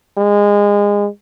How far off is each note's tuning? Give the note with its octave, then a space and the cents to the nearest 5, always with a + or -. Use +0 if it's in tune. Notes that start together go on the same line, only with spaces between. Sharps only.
G#3 -25